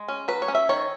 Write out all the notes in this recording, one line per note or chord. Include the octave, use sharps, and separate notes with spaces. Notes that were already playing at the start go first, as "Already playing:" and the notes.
Already playing: G#3
C#4
F#3 B4
C#5
C#4
E5
D#3 C#5